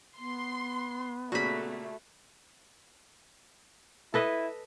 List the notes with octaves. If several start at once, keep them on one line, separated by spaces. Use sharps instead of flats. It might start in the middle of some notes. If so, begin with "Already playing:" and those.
B3 C6
A#2 C#3 A3 F#4 B5
E4 A4 B4 D#5